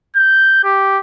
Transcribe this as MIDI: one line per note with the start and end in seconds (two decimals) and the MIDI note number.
0.16 0.60 91
0.64 0.99 67